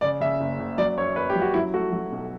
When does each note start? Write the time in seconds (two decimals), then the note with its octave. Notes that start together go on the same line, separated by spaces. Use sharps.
0.01 C#3 D5
0.21 C#3 E5
0.40 F#1
0.60 F#1
0.78 F#3 D5
0.98 F#2 C#5
1.16 F#2 B4
1.29 G4
1.35 F#3
1.42 F#4
1.54 F#3 E4
1.74 A3 F#4
1.92 F#3
2.12 B1